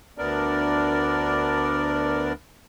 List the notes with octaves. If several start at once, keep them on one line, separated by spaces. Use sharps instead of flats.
D2 B3 D4 A#4 D5